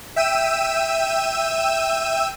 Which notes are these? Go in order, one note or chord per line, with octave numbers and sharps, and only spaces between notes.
E5 G5 E6 D#7 E7